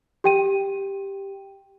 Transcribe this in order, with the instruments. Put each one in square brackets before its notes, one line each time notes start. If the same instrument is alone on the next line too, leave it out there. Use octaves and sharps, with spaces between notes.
[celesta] G4 G5 D#7